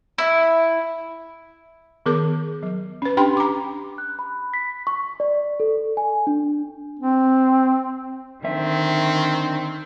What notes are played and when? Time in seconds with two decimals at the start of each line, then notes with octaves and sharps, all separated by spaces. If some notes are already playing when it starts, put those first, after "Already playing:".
0.18 E4
2.06 D#3 B3 G#4 A#4 D6
2.63 F#3
3.02 C#4 B4
3.17 D4 G4 G5 B5 C6
3.37 A#5 D6
3.98 F#6
4.19 B5
4.54 B6
4.87 C#6
5.20 D5
5.60 A4
5.97 G#5
6.27 D4
6.99 C4
8.45 D3 D#3 C4 E5